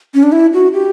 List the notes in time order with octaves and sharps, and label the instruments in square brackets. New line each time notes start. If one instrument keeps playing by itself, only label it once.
[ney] C#4
D4
E4
F#4
G4